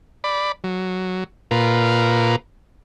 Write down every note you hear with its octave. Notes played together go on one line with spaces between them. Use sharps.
D5 B5
F#3
A#2 F4 A#4 B4